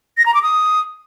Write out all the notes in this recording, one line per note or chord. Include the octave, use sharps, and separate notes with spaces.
A#6
A#5
D6
D#6